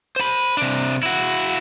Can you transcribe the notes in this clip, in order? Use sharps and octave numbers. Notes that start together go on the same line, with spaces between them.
C5 B5
C3 D4
E4 F#4